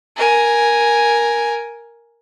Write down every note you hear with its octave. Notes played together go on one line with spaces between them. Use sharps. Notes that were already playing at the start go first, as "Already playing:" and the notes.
A#4 G#5